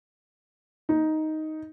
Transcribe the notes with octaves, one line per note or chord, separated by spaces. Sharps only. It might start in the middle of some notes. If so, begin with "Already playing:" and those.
D#4